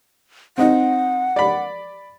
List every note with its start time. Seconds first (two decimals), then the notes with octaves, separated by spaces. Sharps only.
0.58 C4 D#4 F#5
1.36 D5 B5